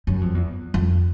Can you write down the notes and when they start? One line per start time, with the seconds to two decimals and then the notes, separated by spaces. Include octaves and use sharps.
0.07 F#2
0.21 F2
0.35 E2
0.74 F2